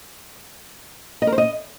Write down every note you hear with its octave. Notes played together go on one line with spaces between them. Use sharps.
D#5
A#4
C5
D#5